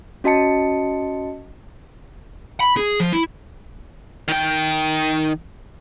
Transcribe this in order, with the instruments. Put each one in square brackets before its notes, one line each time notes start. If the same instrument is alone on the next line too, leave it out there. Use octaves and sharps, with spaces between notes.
[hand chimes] C#4 F#4 D#5 A5 C#7
[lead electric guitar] B5
G#4
F3
E4
D#3 G5